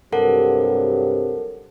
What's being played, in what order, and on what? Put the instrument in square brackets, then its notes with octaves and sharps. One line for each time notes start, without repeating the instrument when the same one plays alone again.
[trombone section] G2 C3 F#3 [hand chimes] A4 A#4 F#5